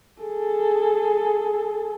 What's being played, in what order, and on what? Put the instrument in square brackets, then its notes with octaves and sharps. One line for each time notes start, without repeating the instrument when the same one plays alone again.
[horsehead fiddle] G#4 A4